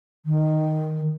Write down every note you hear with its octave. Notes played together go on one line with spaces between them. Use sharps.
D#3